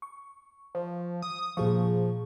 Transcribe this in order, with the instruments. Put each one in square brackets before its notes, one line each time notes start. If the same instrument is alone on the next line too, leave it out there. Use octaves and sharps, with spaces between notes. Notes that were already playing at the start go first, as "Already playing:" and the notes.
[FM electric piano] C#6
[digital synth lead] F3
D#6
[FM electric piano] A#2 G#4 C#6 [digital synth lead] F3